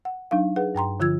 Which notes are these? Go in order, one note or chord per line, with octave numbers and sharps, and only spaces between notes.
F#5
F#3 D4 D#4 F5
G#4 B4 F#5
G2 G5 A#5 C6
D3 F3 F4 E6 G#6